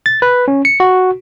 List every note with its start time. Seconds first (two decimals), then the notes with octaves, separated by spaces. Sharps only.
0.06 A6
0.22 B4
0.48 C#4
0.65 C#7
0.80 F#4